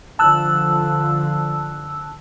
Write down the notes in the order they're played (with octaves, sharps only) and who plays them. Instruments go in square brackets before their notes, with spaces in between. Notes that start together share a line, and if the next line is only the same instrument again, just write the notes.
[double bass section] D3 F3 [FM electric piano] A5 E6 F#6